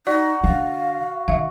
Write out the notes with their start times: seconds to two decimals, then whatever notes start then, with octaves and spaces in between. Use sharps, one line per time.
0.07 D#4 F#4 D5
0.44 D3 F5
1.28 D#3 E5 F5